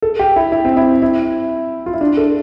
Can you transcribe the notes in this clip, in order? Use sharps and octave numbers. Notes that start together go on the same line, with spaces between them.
A4
G4
E4
E4
C4
E4
E4
F4
E4
D4
A4